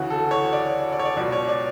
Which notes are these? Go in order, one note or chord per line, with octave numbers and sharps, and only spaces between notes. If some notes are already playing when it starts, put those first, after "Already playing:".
Already playing: D2 C#3 E3 F#4
A4
C#5
D5
D5
C#5
D5
C#2 B2 D5
C#5
D5